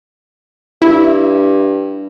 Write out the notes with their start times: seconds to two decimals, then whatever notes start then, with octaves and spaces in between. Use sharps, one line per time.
0.82 G2 E4